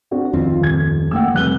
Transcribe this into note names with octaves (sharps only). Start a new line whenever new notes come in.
C4 D4 F#4
D1 F2 D#3 C4 F4
D#1 G#6
E3 A3 A#3 F#5 G5 E6
F1 G3 F#6 G7